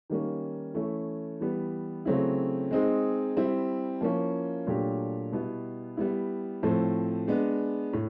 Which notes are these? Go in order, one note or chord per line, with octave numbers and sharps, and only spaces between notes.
D#3 G3 A#3 C#4
E3 A3 C#4 E4
E3 G3 B3
C#3 F#3 A3 C4 E4
G#3 C4 D#4 G#4
G3 C4 E4
F3 A#3 C#4 E4
A#2 F#3 A3 D4 G4
B2 G3 B3 E4
G3 B3 E4
A2 F3 A3 C4
G#3 B3 D4
A2